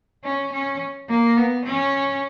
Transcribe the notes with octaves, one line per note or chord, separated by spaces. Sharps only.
C#4
C#4
A#3
B3
C#4